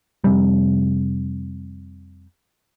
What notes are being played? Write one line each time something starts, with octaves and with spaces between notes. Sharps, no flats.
F1 C3 G3